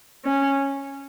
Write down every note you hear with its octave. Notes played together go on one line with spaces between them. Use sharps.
C#4